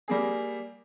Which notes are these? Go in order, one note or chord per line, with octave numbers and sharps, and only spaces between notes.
G3 A#3 G#4